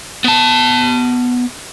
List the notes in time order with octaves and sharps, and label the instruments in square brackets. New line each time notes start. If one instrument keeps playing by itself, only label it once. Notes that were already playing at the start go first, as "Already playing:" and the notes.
[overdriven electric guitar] B3 A5